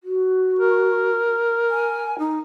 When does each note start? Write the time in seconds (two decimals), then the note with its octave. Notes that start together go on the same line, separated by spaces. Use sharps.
0.03 F#4
0.59 A#4
1.70 G#5
2.18 D#4